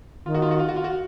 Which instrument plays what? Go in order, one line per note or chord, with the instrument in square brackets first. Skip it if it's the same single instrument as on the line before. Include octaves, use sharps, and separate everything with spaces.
[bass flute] D#3 [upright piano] F4
[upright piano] F#4
F4
F#4
F4
F#4
F4
F#4